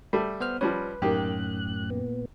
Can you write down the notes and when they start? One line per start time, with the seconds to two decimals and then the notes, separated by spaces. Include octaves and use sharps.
0.13 G3 A3
0.40 B3 C5 F6
0.61 F3 G3 C#4 B4
1.02 F#2 A2 D#3 A#3 G4 F#6
1.90 A#2 B3